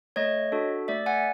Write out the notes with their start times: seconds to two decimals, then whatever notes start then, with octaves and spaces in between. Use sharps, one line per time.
0.16 A3 C#5 D#5
0.52 D4 F#4 A4
0.88 A3 D5 E5
1.06 F#5 G#5